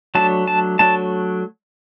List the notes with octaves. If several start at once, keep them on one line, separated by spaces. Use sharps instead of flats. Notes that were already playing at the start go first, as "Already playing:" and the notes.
F#3 A3 D4 A5
A5
F#3 A3 D4 A5